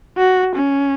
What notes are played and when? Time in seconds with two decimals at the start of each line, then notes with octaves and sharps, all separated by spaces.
0.18 F#4
0.55 C#4